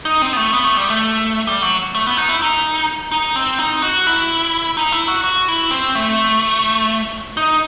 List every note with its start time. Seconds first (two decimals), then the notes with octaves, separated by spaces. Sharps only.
0.05 D#4
0.22 C4
0.33 B3
0.37 A3
0.53 B3
0.65 A3
0.77 G3
0.90 A3
1.47 G3
1.62 F#3
1.95 A3
2.07 B3
2.17 D#4
2.29 E4
2.42 D#4
3.12 D#4
3.36 C4
3.59 D#4
3.82 F#4
4.07 E4
4.77 D#4
4.92 E4
5.08 F#4
5.24 F#4
5.48 E4
5.71 C4
5.95 A3
7.37 D#4